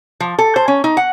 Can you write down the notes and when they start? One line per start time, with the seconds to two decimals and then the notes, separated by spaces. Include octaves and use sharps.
0.20 F3
0.39 A4
0.56 C5
0.68 C#4
0.84 D#4
0.97 F#5